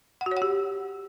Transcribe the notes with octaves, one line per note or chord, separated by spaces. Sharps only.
F#5
F#4
C#5
F#5
G4